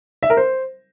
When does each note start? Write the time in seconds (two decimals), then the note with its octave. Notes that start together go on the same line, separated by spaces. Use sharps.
0.23 E5
0.30 A#4
0.37 C5